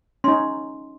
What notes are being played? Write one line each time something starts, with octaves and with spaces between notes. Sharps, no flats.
C#4 D#4 C6